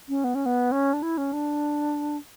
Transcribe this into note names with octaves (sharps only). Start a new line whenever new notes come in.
C#4
B3
C#4
B3
C#4
D4
E4
C#4
D4